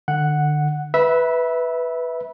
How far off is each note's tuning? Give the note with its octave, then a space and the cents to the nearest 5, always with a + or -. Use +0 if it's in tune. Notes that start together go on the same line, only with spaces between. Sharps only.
D3 +35 F#5 +0
B4 +0 E5 -10 B5 -30